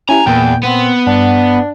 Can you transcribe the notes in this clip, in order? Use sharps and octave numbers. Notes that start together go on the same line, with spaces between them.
C#4 E4 G4 G#5 A#5
E2 A#2 A#3 G5
B3 C4
G2 D4 F#5